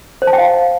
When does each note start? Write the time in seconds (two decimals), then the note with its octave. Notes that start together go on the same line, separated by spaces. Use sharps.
0.22 C5
0.27 A5
0.33 G5
0.38 F5